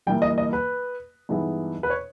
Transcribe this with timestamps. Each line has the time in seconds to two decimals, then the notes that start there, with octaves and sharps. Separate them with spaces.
0.07 G1 G2 E3 A#3 G5
0.22 D#5
0.38 D#5
0.53 B4
1.29 G2 E3 G#3 B3 D#4
1.83 B4
1.90 C#5